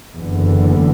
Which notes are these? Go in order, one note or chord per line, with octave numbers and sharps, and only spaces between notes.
F#1 E2 D3